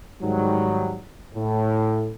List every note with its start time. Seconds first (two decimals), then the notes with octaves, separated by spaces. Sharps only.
0.22 G#2 D#3 F#3 G3
1.35 A2